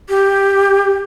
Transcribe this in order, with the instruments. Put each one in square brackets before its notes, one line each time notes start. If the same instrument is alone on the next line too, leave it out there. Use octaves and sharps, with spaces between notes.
[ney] G4